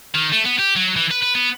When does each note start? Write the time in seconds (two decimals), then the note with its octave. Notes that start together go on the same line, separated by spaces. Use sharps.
0.14 D#3
0.32 A3
0.45 B3
0.59 G4
0.76 F#3
0.96 E3
1.11 B4
1.22 B4
1.35 B3